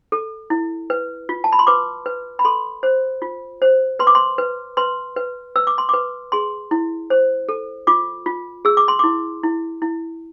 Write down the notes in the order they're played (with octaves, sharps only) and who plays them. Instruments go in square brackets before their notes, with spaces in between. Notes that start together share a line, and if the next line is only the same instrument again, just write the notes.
[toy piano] A4
E4
B4
F4
A5
B5
C6
B4 D6
B4
B5
A4 C6
C5
F4
C5
B4 C6
D6
C6
B4
B4 C6
B4
B4 E6
D6
C6
B4 D6
G#4 C6
E4
C5
A4
F4 D6
F4
G#4 E6
D6
C6
E4 D6
E4
E4